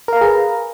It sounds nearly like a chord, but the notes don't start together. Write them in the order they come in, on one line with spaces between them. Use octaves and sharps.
A#4 F5 A#5 G#4 B4